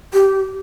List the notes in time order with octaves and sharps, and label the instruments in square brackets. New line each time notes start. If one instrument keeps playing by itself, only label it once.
[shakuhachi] G4